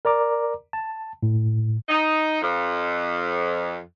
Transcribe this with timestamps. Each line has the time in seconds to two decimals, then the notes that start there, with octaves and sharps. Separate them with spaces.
0.05 A#4 D5 A#5 D6
0.73 A5
1.23 A2
1.88 D#4
2.42 F2